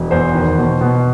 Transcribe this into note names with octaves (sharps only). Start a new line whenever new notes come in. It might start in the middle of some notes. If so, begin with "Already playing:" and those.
Already playing: E1
E2 C5
D#3
B2
B2